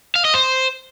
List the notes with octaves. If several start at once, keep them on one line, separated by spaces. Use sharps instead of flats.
F5
D#5
C5